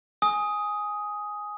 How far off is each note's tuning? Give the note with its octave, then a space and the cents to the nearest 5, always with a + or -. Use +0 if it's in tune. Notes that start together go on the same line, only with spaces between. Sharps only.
G#5 +0 D#6 +10